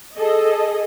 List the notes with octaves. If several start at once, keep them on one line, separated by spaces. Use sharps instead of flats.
G#4 A4 D#5